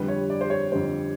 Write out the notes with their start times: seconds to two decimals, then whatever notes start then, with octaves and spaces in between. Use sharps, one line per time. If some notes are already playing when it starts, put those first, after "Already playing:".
Already playing: F2 D3 G3 B4
0.08 C#5
0.30 D5
0.41 C5
0.50 C#5
0.72 F2 D3 G3 C5